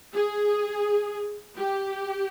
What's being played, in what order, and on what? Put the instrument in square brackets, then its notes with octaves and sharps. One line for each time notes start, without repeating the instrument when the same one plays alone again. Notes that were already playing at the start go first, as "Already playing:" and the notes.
[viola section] G#4
G4